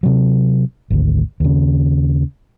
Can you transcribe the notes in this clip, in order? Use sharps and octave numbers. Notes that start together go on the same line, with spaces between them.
C3 F#3
G#1 D2
D#2 C#3